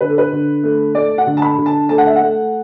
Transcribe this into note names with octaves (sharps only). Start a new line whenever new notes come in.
D3 B4
A4
B4
D3
A3
A3 D5
F#5
D3
A5
B5
D3
A5
A3 A5
F#5
E5
F#5
A3